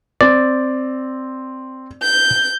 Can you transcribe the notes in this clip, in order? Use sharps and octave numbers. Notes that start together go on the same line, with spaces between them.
C4 D5
G6